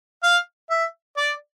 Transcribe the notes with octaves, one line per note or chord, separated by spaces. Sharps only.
F5
E5
D5